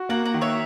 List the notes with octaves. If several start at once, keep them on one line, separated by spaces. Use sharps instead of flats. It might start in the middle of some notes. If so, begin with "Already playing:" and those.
Already playing: F#4
A#3 F#5 A#5
F#5 A#5
D#3
C#5 E5